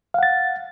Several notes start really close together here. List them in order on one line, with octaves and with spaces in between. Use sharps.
F5 F#5 A6